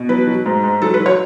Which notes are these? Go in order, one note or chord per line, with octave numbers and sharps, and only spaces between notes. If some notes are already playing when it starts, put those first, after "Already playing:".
Already playing: B2
F#3 B4
F#3
G#2
G#2
F#3 A4
B4
F#3
C#5